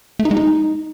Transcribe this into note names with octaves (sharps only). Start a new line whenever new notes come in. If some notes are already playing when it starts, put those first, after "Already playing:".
A3
D#4
G#3
D#4